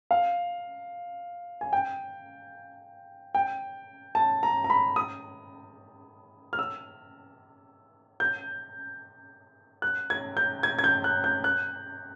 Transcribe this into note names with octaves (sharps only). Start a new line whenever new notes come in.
F5
G#5
G5
G5
A5
A#5
A#5
B5
D#6
F6
E6
G6
F#6
G#6
G6
G#6
G#6
G6
F#6
G6
F#6